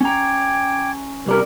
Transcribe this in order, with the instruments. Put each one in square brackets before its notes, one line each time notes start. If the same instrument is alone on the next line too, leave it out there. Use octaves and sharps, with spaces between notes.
[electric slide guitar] C#4 A#5 [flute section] G5 D6 G#6
[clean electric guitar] C2 G3 A#4 [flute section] G4 B4